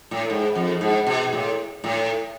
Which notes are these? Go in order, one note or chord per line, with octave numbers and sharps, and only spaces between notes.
A2
G#2
F2
G#2
B2
A2
A2